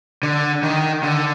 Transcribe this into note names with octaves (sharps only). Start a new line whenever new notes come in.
D3
D#3
D3